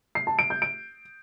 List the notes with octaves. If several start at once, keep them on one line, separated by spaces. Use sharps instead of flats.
C7
A5
D7
G6
D7